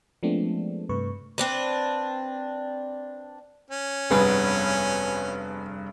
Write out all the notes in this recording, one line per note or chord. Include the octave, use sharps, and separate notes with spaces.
F3 G#3 A3 B3 C4 D4
G2 C3 A3 B4 C#6
C4 D4 B4
C#4
F1 G2 B3 G#4